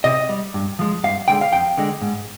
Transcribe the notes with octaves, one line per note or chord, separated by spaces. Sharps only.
C3 D#5
G3
G2
F3 G#3
G2 F5
D3 G#3 G5
F5
F2 G5
D3 G#3
G#2